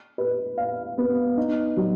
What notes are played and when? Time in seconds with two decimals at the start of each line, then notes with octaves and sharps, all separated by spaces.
0.18 B4
0.58 F5
0.98 B3
1.37 D#4
1.77 F#3